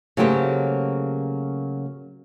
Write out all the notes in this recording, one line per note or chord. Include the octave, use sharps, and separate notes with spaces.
C#3 F#3 A3 A#3 G4 C5